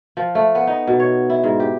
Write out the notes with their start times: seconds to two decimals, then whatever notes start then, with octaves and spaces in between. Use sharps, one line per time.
0.17 F3
0.35 A3
0.55 B3
0.67 D#4
0.87 B2
1.00 C#5
1.30 E4
1.44 G#2
1.60 G4